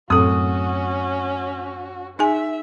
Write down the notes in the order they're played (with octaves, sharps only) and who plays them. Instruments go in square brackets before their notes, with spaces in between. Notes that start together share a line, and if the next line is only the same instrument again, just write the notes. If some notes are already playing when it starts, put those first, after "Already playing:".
[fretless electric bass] F#2 A2 [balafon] C4 A4 [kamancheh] C#4 F#4 [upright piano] D#6
[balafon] D#4 G#4 G#5 [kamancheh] E5